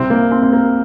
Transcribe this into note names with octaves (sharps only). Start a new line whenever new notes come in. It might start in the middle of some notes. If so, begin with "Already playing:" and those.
Already playing: C2 C3 G3 C4
A#3
C4
C4
A#3